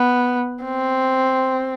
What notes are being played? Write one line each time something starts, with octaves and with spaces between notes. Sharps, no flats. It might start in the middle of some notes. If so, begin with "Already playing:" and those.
Already playing: B3
C4